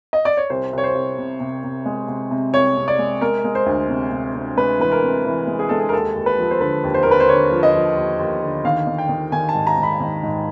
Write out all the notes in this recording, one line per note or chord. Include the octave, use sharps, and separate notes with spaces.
D#5
D5
C#5
C2 C5
C2 C#5
C5
C2
C3
C3
C3
G#3
C3
C3
C2 C#5
C3
D5
G#3
G#3 A#4
G#3
C5
D2
C3
C3
C3
G#3 B4
E3 B4
A#4
C3
E3
G#3
G#4
G#3 A4
G#4
A#4
D#2 A4
D#2
B4
F3
C5
D3 B4
D#2
C5
A#4
D#2 B4
C5
D3 C#5
F3
D#5
F3
D#2
D#2
D3
D#3 F5
D#3
G5
D#3
D#3 G#5
A5
G#2
A#5
G#2
B5
D#3
G#2